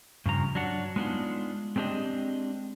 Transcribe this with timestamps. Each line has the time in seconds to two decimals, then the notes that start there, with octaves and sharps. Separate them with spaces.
0.26 G2 C#3 F3 A#5
0.55 F#3 D4 F#5
0.96 G#3 B3 D4 D#4 F4
1.76 G#3 C4 D4 G4 D#5